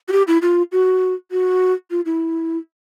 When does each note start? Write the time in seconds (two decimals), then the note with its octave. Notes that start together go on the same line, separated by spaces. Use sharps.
0.08 F#4
0.12 G4
0.28 E4
0.42 F4
0.72 F#4
1.31 F#4
1.91 F4
2.06 E4